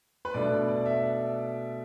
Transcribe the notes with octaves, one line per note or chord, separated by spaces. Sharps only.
B4
B2 A3 D4 D5
D5
E5